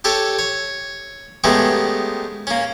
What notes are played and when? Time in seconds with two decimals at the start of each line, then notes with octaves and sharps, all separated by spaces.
0.04 G4 A4 C#5
0.39 C#5
1.44 D#3 G#3 A3 B3 C#4 G4
2.47 A#3 C#4